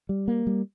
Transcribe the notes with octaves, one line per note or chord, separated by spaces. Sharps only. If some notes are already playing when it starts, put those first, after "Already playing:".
G3
A#3
G3